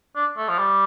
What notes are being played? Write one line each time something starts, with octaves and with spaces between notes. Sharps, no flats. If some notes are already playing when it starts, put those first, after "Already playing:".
D4
A3
F3
G3